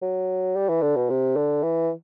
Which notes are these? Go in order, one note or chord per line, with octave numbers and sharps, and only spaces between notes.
F#3
G3
E3
D3
B2
C3
D3
E3